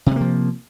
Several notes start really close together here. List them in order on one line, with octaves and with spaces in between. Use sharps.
C3 G3 A#3 F3